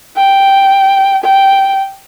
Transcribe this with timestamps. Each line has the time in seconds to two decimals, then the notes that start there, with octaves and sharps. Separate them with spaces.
0.16 G5
1.23 G5